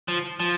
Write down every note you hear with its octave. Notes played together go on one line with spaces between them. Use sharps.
F3
F3